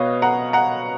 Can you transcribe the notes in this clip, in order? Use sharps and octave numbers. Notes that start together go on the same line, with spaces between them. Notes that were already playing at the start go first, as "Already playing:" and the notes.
Already playing: B2 B4 C#5 D#5 F5
F#5 A#5
F#5 A#5